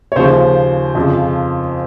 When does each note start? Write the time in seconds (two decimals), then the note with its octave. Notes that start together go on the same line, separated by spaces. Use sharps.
0.12 C#5
0.16 D#2 C#3 F3 C5
0.95 F2 C#3 F3